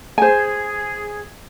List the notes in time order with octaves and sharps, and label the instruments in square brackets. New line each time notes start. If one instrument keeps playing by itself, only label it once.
[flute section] G#4 [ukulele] C5 G#5